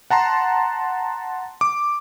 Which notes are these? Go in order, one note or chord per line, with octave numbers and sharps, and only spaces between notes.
F#5 A5 A#5 C6
D6